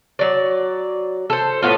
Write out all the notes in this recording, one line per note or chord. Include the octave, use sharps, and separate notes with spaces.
F#3 D5
A4 C5
A2 B3 F4